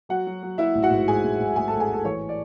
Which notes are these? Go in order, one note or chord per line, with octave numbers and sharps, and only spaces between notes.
F#3 F#4 F#5
F#3
F#3
F#3 E4 E5
A1
F#4 F#5
G#2
G#2 G#4 G#5
G#2
G#2
A1 G#4 G#5
A4 A5
A1
G#4 G#5
A1 A4 A5
E3 C#5 C#6
D5